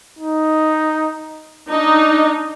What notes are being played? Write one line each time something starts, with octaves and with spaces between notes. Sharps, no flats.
D#4
D4 D#4